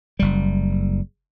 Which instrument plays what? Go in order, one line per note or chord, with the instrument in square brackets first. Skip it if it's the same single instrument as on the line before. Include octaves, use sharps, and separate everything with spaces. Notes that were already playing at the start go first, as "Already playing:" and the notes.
[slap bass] F#1 G3